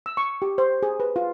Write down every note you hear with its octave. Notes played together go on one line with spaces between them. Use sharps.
E6
C#6
G4
C5
G#4
B4
F4